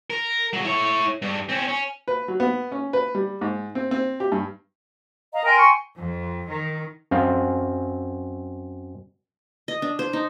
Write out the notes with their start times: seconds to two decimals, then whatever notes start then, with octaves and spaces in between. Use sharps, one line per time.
0.10 A#4
0.53 C#2 F#3
0.64 E4 C#5
1.22 G2
1.49 C4 C#4
1.68 C#4
2.08 B4
2.28 F#3
2.40 B3
2.72 C#4
2.93 B4
3.15 G3
3.41 G#2
3.75 C4
3.91 C4
4.20 G4
4.32 G2
5.33 D#5 F5 A#5
5.45 A#4 G5 G#5 C6
5.59 C#6
5.99 F2
6.51 D#3
7.11 F#2 C4 F5
9.68 D#5
9.82 D4
9.99 C5
10.13 D#4